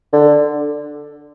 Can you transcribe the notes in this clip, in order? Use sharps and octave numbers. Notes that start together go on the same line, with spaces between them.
D3